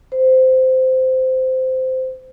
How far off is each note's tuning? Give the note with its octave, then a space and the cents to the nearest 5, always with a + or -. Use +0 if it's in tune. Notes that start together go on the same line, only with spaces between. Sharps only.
C5 -15